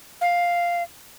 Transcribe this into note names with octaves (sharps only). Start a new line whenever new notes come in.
F5